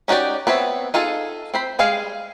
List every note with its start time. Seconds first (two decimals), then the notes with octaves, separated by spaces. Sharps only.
0.08 C#4 D#4 F#4 G4 D5
0.47 B3 C4 C#5 E5
0.94 D#4 F4 G#4 A4
1.54 C4 C5 B5
1.79 G3 G#3 G#4 F5